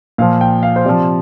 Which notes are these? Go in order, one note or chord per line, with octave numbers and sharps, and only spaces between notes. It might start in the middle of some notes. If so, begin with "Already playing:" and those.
A#2 F3 F5
G5
F5
C5
C3 F3 D5